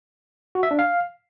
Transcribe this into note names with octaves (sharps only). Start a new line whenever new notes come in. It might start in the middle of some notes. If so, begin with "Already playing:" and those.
F#4
E5
D4
F5